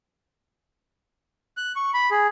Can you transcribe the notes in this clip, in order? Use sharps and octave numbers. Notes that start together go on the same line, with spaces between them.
F#6
C#6
B5
G#4